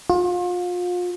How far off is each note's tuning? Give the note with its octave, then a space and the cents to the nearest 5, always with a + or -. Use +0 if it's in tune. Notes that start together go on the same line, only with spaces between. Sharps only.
F4 +35